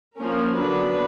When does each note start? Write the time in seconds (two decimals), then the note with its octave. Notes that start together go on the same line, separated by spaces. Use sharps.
0.17 F3 A#3 C#4 A#4
0.54 D3 F#3 B3 D4 B4